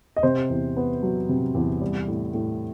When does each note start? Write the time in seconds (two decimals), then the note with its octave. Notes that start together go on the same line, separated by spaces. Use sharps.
0.17 D#5
0.23 C3 C5
0.50 E2
0.77 B3
1.03 F#3
1.29 C3
1.55 E2
1.81 G3
2.08 A2
2.34 A2